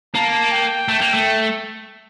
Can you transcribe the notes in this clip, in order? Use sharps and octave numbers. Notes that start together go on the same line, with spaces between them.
A#3 A5
G5
A3
A#3
A3